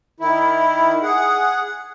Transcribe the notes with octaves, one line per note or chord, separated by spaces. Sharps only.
D#3 E4
G#4 F#5